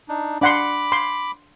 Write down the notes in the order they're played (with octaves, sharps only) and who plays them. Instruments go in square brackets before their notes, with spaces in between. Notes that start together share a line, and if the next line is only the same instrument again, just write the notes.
[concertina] D4 D#4
[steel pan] D4 F#5 C6 [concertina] B5 D6
[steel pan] C6